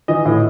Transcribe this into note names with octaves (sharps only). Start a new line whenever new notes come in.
E3 D#5
A2